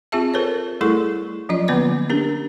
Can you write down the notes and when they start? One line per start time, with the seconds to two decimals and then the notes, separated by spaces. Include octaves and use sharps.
0.12 C4 F4 G#4 E5 A5
0.34 F4 A4 A#4 C5 C#5
0.81 G3 A3 E4 G#4 A4 C#6
1.49 F3 F#3 C#4 F4 D5 D#5
1.68 D3 A#3 B3 B4 D6
2.10 C#4 D4 G4 A#4